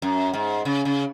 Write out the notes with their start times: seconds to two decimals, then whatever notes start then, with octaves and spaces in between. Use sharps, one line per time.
0.02 F#2
0.34 G#2
0.65 C#3
0.85 C#3